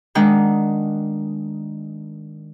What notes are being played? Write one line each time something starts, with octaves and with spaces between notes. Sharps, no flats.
D#3 G#3 D4 F#5 G5